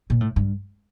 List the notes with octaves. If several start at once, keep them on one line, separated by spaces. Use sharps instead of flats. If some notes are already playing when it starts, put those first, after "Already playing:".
A#2
A2
G2